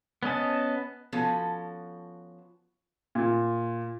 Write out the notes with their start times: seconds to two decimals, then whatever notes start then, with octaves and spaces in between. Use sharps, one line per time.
0.23 B3 C#4 D#5 A5
1.12 F3 B3 C#4 F#4 A4
3.15 A#2